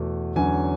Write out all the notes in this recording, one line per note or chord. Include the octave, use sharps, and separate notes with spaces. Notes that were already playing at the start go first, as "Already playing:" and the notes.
Already playing: E2 B2 A3
E2 D3 F#3 C#4 G#5